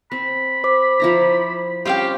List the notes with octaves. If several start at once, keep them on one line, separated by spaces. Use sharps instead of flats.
C4 B5
C5 D6
F3 E4 A#5
G3 C4 C#4 F4 G4 F5 G5